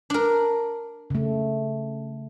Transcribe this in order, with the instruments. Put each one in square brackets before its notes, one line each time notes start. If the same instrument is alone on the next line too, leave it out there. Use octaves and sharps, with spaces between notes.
[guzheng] D4 A#4
[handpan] C#3 A3